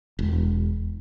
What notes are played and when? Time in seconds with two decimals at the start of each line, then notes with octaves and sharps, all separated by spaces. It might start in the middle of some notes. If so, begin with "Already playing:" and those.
0.19 E1